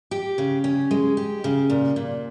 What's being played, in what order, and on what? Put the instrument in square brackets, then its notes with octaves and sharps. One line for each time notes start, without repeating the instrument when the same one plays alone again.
[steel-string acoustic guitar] G4
C#3
C#4
G#3
G4
C#3
A#2
A#2